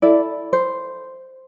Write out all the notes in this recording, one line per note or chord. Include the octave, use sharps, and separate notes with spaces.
E4 A4 D5
C5